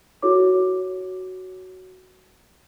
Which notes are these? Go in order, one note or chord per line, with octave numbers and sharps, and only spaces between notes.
E4 F#4 A4 C#5 D6